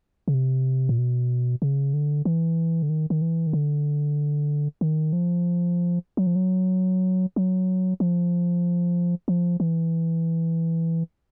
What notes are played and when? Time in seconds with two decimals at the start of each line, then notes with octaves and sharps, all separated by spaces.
0.28 C#3
0.34 C3
0.89 A#2
0.98 B2
1.62 C#3
1.93 D3
2.25 E3
2.83 D3
2.89 D#3
3.10 D#3
3.22 E3
3.47 D#3
3.53 D3
4.81 D#3
5.13 F3
6.17 F#3
6.27 F3
6.36 F#3
7.36 F#3
8.00 F3
9.28 F3
9.60 E3